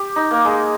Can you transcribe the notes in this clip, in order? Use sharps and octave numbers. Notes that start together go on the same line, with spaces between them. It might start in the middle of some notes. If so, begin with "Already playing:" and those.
Already playing: G4
D#4
A#3
G#3